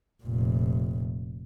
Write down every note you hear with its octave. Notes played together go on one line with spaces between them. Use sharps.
F1 A#2